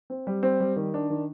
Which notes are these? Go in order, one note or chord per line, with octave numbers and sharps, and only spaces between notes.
C4
G3
C4
G3
D#3
D4
D#3